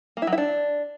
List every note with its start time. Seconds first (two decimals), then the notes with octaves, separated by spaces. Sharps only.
0.17 A#3
0.22 E4
0.27 F#3
0.32 E4
0.38 D4